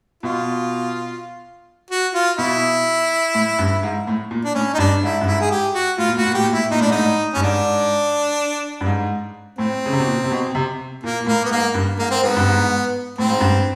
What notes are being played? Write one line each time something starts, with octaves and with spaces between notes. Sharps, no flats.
B2 F4
F#4
F4
B2 E4
A2
G2
G#2
A2
A#2
D4
A2 C#4
D#4
G2 D4
G#2 E4
G2
G#2 E4
G#4
G4
F#4
A2 F4
A#2
A2 F#4
A#2
A2 G4
A#2
A2 E4
A#2 D#4
A2 D4
G#2 D#4
A2
G2 C#4
G#2 D4
G2
G#2
A2 C4
C#3
C3
B2
A#2
C3
B2
C3
A#2 A#3
A#2
A2 A#3
B3
G#2 A#3
G2
G#2 A#3
C4
G#2 B3
G2
G#2
A2 C4
G#2
G2